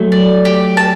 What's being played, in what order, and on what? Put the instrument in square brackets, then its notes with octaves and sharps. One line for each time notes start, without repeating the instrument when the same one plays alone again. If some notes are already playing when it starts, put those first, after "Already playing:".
Already playing: [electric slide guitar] F#3 A3
[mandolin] D5
G4
A5